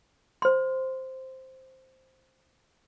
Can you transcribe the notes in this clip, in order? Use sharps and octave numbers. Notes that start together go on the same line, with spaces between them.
C5 C6